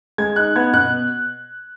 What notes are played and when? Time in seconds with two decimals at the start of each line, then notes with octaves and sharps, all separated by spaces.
0.18 G#3 G#6
0.36 D#4 F#6
0.56 B3 G#6
0.74 B2 F#6